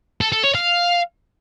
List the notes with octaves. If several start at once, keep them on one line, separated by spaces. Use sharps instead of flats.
A4
A4
C#5
F5